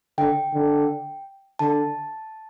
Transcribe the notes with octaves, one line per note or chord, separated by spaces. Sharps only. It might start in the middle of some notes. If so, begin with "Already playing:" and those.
D3 G5
D3
D3 A5